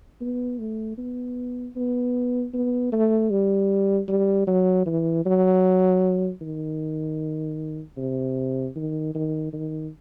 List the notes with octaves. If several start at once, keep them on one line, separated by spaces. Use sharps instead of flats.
B3
A3
B3
B3
B3
A3
G3
G3
F#3
E3
F#3
D#3
C3
D#3
D#3
D#3